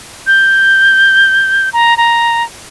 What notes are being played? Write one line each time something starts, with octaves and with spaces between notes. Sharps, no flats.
G6
A#5
A#5